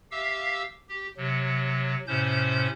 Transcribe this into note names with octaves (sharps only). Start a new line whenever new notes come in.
G4 E5 F5 E6
G4
C3 F#3
A2 C3 C#4 C5 G6